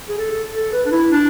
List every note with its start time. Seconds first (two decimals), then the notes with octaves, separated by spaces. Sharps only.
0.09 G#4
0.18 A4
0.55 A4
0.73 B4
0.86 D4
0.91 E4
1.11 D4